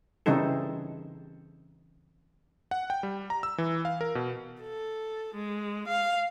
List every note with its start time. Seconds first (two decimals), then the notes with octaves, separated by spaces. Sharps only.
0.26 C#3 E3 G3 C4 D#4 A4
2.71 F#5
2.90 G5
3.03 G3
3.30 A#5
3.43 E6
3.58 E3
3.85 F5
4.01 A#4
4.15 B2
4.62 A4
5.35 G#3
5.88 F5